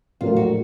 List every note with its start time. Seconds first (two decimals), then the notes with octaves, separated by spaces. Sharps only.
0.21 A#1 A2 F#3 A#3 F4
0.36 F#4